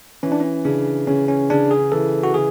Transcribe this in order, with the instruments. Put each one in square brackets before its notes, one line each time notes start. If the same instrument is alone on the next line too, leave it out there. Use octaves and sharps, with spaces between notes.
[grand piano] E3 [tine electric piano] C#4
[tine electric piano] D4
C#4
[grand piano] C#3 [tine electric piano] D4
[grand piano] C#3 [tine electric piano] C#4
[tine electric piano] C#4
[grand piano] C#3 [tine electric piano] D4
[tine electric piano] G#4
[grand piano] E3 [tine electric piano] A4
[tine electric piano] F#4
[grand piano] C#3 [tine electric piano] G#4